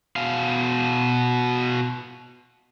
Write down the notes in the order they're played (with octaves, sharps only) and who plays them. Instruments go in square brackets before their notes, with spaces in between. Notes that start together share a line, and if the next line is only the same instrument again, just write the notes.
[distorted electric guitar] B2 F5